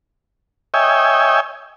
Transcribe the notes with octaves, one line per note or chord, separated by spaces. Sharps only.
C#5 D#5 E5 G5 G#5